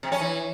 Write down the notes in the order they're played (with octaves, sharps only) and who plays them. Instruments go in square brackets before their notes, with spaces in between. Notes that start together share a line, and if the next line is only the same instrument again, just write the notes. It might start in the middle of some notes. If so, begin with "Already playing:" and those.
[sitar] C3
C#4
E3